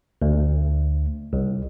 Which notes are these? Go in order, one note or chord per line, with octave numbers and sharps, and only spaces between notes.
D2
C2